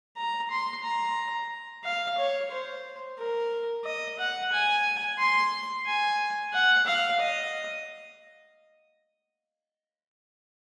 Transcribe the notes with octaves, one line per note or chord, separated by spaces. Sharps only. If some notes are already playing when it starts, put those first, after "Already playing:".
A#5
C6
A#5
F5
C#5
C5
A#4
D#5
F#5
G#5
C6
G#5
F#5
F5
D#5